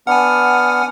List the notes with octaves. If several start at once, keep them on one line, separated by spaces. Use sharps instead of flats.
B3 D4 F#5 G#5 F6